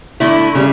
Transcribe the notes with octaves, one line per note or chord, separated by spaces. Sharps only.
D3 A3 E4
C#3 G3